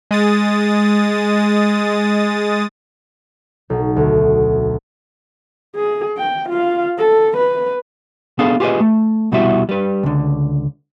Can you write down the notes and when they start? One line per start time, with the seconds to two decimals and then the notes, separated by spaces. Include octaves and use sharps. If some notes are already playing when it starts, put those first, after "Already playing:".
0.11 G#3 D#6 A6
3.70 B1
3.96 D2
5.76 G#4
6.18 G5
6.49 F4 F5
6.98 A4
7.37 B4
8.39 B3 D4 G#4 A4 F5
8.60 F4 G4 G#4 A#4 B4 D#5
8.80 A3
9.32 C2 B2 G3 E4 F#4 E5
9.69 G3 B4
10.03 C#2 D3